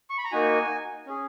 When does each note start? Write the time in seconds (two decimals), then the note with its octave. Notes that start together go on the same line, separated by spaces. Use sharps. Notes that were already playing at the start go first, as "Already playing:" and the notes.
0.10 C#6
0.18 B5
0.25 A#5
0.32 A#3 D#4 F#4 G#5
1.07 C#4 G#4